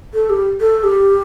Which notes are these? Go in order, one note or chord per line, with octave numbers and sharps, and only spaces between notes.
A4
G4
A4
G4